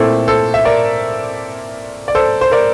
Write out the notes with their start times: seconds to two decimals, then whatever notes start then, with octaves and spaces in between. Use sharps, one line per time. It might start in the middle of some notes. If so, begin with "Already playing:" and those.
Already playing: A#2 A3 C4 E4 A4
0.28 A4 C5
0.54 E5
0.65 A#4 D5
2.08 D5
2.15 A4 C5
2.41 C5
2.51 A#4 D5